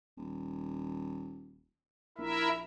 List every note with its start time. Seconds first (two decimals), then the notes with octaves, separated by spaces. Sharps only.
0.17 D#1
2.18 A#1 E4 A#4 E5